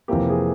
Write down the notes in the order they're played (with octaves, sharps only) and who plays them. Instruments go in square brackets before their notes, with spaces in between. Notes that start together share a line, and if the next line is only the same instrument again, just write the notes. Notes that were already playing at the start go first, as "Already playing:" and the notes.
[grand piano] F2 C3 E3 A#3 G4
G#4